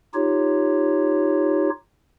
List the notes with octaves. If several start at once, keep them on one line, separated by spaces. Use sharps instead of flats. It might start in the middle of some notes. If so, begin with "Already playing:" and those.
D#4 F4 G4 C#5